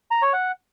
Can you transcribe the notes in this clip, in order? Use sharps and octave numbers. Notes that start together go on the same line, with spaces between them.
A#5
C#5
F#5